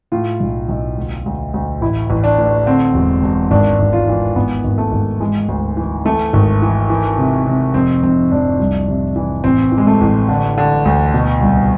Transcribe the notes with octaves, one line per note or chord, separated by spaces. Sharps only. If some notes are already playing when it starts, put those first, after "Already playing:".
A2 F4
B1
B1
D2
D2
D2
A1 E4
A1
D4
A2
D3 C4
E1
E1
G#1 D4
G#1
F4
E3
G#1 B3
G#1
A3
G#1
E3 G#3
D2
E3
E3 A3
G#1
E3
E3
C3
C3
F1 C4
F1 C4
F1 D4
C2
C3
E3
A1 C4
E3
G#3
A3
A1
D3
D3
D2
B2
C2